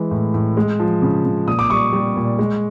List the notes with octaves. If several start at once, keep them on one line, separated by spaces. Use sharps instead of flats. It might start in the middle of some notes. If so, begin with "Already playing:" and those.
Already playing: E3 G#3
A2
A2
G#3
F3
C#3
C#3
A#2 D#6
D6
G3 C#6 D#6
G3
A#2
G#3